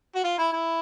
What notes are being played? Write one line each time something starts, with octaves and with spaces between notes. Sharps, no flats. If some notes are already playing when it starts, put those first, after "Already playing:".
F#4
F4
E4
E4